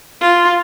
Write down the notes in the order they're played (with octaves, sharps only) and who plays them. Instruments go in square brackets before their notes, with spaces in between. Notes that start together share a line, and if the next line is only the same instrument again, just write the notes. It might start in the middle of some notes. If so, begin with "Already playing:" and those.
[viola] F4